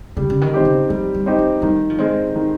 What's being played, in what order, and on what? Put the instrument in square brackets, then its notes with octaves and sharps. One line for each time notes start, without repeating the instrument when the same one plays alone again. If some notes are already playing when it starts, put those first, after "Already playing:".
[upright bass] C#3 [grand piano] G3
[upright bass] C#3
D#3
[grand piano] C4 D#4 G4
[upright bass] C#3
[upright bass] F3 [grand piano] G3
[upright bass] G3
[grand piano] C4 D#4 G4
[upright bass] G#3
[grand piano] D#3 [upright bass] G3
[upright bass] F3
[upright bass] D#3 [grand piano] G#3 C4
[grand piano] D#3